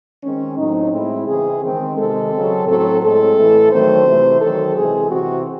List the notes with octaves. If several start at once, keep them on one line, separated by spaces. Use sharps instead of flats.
D#3 G#3 C4 C#4
A2 F#3 C4 D#4
A2 G#3 C4 E4
C#3 E3 C4 G#4
D#3 G#3 C4
C3 D#3 G#3 A4
C#3 F#3 C4
A2 F#3 C4 A4
A2 G#3 C4 A4
A2 E3 A3
D#3 F#3 A3 C4 C5
C3 E3 A3
D#3 F#3 C4 A4
C3 E3 G#3 C4 G#4
C3 E3 C4 F#4